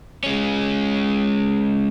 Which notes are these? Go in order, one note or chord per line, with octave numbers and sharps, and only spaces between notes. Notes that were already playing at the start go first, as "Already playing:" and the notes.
G#3 C#4